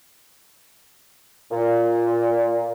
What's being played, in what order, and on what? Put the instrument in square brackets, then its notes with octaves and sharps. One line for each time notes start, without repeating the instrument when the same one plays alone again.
[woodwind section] A#2